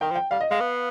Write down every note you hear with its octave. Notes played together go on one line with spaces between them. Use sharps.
D#3 G5
F3
G5
G3 F5
D#5
G#3 F5
B3